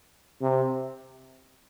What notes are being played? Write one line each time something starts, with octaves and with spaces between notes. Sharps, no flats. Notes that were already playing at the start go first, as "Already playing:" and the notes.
C3